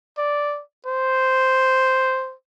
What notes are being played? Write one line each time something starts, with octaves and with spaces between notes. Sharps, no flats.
D5
C5